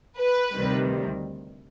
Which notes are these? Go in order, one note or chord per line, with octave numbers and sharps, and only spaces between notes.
B4
D2 C3 D#3 G3